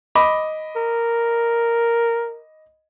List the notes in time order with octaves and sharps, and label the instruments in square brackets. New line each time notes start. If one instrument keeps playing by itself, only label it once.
[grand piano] D#5 B5 D6
[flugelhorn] A#4